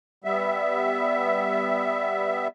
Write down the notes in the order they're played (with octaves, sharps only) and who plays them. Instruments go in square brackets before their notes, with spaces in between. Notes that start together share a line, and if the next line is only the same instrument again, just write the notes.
[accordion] G3 B3 E5